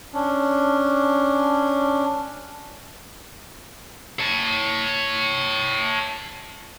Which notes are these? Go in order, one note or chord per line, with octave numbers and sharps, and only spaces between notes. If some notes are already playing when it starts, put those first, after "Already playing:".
C#4 D4
C#5 A5